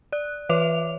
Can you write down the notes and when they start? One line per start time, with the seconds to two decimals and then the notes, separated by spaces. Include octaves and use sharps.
0.12 D5 F#6
0.49 E3 B4 C#5 E5 D6 F7